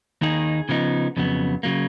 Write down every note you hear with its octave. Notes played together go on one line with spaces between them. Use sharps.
D#2 D#3 A#3 D#4 G#4
C#3 F3 B3 D#4
F2 C#3 F#3 B3
C#3 F#3 A#3